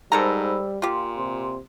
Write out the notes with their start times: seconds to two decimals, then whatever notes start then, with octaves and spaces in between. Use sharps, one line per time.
0.12 G#2 G3 A4 A#4 C5 A#5 B5 E6
0.82 A#2 F4 G4 C6
1.17 C3